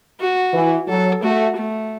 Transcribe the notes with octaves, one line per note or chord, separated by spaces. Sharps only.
F#4
E3
F#3 A4
A3 F#4
A3